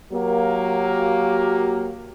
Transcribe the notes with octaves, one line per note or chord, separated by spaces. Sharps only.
F#3 A#3 G4